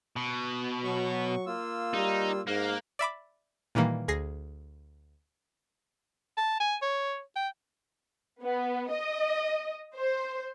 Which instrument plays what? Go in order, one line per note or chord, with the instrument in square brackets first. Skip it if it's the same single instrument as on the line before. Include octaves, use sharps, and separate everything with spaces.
[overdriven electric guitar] B2
[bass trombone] F#3 [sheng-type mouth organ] C#6
[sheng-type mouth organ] A#3 F4 E6
[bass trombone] G3 [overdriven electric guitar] D#4
[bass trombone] G#2 [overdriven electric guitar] A#3 [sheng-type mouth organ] F6 F#6
[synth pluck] D5 E5 B5 D6
A#2 D#3 E3 G3 A#3
D2 G#4 A#6 C7
[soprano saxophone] A5
G#5
C#5
G5
[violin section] B3
D#5
C5